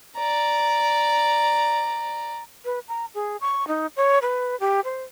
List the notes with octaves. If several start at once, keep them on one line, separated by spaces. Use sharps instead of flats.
D5 A#5
B4
A#5
G#4
C#6
D#4
C#5
B4
G4
C5